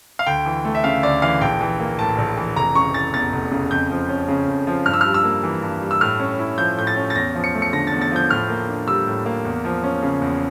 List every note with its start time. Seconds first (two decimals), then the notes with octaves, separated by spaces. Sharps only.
0.19 F5
0.26 D2 G5
0.46 E3
0.65 A3
0.75 E5
0.84 C#3 F5
1.03 D2 D5
1.22 E3 F5
1.41 A#1 G5
1.61 E3
1.80 A#3
1.99 A2 A5
2.18 A#1
2.37 E3
2.56 F1 A#5
2.75 C#3 C#6
2.94 E3 A6
3.13 E2 A6
3.33 F1
3.52 C#3
3.71 F2 G6
3.90 F3
4.09 C#4
4.28 C#3
4.48 F2
4.67 F3
4.86 G2 F6
4.94 E6
5.01 G3 F6
5.14 E6
5.24 A#3
5.43 E3
5.62 G2
5.81 G3
5.91 E6
6.01 A2 F6
6.20 C#4
6.39 E4
6.58 F3 G6
6.77 A2 G6
6.87 A6
6.96 C#4
7.10 A6
7.15 E2 A#6
7.35 F3
7.44 C#7
7.54 A3
7.62 C#7
7.73 D3 A#6
7.87 E2 A6
8.01 A6
8.11 F3 G6
8.30 A2 F6
8.49 A#3
8.69 D4
8.87 G3 E6
9.07 A2
9.26 A#3
9.45 E2
9.65 F3
9.84 C#4
10.02 C#3
10.22 E2